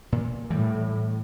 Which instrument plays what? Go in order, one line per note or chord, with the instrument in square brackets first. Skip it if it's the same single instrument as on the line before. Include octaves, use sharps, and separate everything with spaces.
[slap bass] A#2
[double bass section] A2 [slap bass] E3 G3